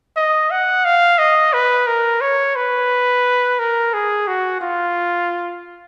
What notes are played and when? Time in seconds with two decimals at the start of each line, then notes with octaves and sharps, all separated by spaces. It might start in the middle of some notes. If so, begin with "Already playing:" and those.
0.16 D#5
0.51 F#5
0.85 F5
1.19 D#5
1.53 B4
1.87 A#4
2.21 C#5
2.55 B4
3.59 A#4
3.93 G#4
4.27 F#4
4.61 F4